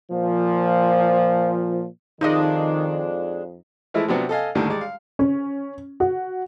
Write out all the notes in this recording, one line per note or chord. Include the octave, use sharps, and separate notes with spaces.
A#2 F3
F2 D#3 G#3 D4 D#4 F4 D#5
E3 F3 G#3 A3 E4
C3 F3 F#3 B3 D4
A4 D#5 F5 G#5
D#2 A2 D3 D#3 G3
G3 G#3 D5
F5
C#4
F#4